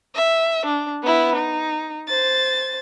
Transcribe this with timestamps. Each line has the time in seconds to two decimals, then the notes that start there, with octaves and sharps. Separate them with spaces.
0.15 E5
0.66 D4
1.03 B3 E4
1.36 D#4
2.09 C5 A6